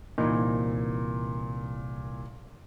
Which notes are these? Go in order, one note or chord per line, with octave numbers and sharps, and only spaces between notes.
C2 A#2 E3 D#4